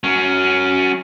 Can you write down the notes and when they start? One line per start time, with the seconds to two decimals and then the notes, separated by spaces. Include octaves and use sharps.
0.04 F#3 C#4